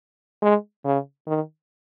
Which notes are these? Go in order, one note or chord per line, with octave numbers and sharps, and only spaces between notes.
G#3
C#3
D#3